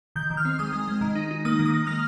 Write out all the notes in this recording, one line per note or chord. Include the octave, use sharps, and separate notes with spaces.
D#3 G6
D#3
F6
C4
G#3 D#6
G#3
G#3
D#3
D#4
D#4
A#3 D#6
D#3
D#6
A#3
A#3 F6